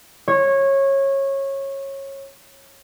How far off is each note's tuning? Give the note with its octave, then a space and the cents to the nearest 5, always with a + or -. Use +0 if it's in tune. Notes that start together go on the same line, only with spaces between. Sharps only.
C#5 -20